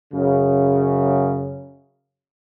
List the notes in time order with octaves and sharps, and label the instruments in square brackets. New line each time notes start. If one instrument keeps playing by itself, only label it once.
[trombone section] F#2 C#3